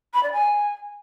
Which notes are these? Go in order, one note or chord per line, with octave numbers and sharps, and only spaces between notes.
B5
D5
G#5